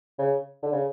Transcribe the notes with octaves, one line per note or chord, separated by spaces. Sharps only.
C#3
D3
C#3